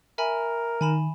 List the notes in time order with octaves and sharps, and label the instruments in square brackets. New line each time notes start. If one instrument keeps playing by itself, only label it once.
[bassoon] A#4 [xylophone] E5 G#5 B5
[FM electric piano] D#3 [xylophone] G#5 B5 E7